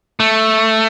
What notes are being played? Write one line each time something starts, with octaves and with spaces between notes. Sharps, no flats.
A3